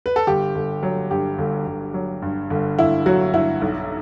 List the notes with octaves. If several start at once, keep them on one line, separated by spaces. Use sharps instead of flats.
B4
A4
G1 G4
G1
F#3
G2 G4
G1
G1
F#3
G2
G1
G1 E4
F#3 F#4
G2 E4
B1